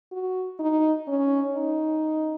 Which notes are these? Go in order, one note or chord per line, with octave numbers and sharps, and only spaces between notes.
F#4
D#4
C#4
D#4